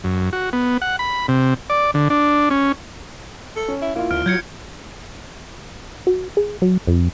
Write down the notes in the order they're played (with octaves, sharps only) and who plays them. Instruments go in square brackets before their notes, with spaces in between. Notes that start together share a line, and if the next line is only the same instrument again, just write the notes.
[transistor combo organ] F#2
F#4
B3
F#5
B5
C3
D5
D3
D4
C#4
[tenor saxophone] A4
[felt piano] C#4
[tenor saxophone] E4
[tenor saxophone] A#3 [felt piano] E4 F4
[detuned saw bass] D2 [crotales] F6 D7
[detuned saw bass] F#3 [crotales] G6 G#6 C#7
[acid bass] F#4
G#4
F#3
F2